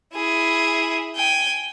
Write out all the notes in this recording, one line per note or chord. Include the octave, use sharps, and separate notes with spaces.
E4 G#4
G5 G#5